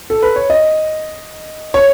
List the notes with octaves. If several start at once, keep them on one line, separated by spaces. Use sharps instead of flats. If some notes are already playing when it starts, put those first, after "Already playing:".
A4
B4
C#5
D#5
C#5